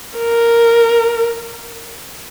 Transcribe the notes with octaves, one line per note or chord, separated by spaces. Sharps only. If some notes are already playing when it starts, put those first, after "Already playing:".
A#4